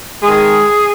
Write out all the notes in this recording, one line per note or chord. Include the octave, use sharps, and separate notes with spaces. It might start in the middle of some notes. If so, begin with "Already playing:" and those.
D#3 G#3 G#4